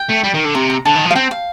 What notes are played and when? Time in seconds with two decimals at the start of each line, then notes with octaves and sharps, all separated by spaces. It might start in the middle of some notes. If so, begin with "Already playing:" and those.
Already playing: G5
0.09 A3
0.24 G3
0.34 D#3
0.45 D3
0.55 C3 A#5
0.70 A#5
0.85 D3 A5
0.95 D#3
1.05 F3
1.11 F5
1.15 C4 G5
1.31 F5